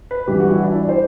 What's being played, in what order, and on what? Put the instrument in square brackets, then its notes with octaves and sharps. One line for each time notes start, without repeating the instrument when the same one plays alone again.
[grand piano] B4
G2 E3 G4
F#4
E4
D4
E4
D5
C5